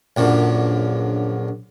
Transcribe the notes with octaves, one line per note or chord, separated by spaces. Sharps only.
A#1 F#2 D3